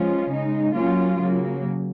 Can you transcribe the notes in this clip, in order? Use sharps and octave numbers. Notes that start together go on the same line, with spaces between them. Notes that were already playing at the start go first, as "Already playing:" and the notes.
Already playing: F3 G#3 C#4 F4
C#3 G#3 D#4
F#3 A#3 C#4 F4
C#3 F#3 A#3